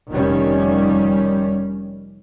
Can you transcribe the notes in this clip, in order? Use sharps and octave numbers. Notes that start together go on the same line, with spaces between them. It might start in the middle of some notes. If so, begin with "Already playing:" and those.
F1 D#3 G3 C#4